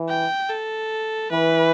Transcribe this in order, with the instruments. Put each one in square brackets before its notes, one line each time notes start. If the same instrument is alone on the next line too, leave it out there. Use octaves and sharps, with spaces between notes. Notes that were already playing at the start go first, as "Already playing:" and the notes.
Already playing: [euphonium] E3
[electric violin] G5
A4
[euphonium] E3 [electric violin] B4